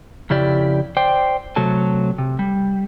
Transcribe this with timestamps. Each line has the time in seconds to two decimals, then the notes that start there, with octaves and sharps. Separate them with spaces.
0.30 F2 C#3 E4 G4 D5
0.97 C5 D5 G5
1.56 C3 F#3 A3 A4 A5
2.18 C3
2.39 G3